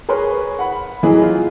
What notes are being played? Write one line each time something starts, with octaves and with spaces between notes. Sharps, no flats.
G#4 A#4 B4 C#5 C6
F#5 B5
A2 E3 F#3 D#4 G#4
F4